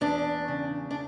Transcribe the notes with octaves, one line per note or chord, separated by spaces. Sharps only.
E2 D4
C#3
D4